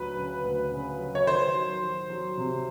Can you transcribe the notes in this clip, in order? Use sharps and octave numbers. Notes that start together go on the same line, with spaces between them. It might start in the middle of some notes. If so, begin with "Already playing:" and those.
Already playing: D2 F#3 B4
C#3
D2
C#3
F#3
C#5
D#3 C5
F#3
F#3
F#3
C3